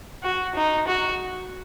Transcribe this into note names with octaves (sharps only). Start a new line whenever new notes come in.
F#4
D#4
F#4